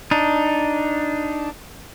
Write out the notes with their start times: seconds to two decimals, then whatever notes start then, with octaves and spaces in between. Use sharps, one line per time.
0.11 D4 D#4